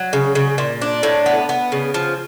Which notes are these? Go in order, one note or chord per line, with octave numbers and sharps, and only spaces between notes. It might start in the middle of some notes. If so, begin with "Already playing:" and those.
Already playing: F#3
C#3
C#3
A#2
D4
A2
B3
B3
C#3
F3